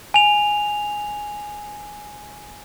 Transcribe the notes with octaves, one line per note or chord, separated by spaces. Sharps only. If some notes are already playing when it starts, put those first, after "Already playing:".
G#5 F7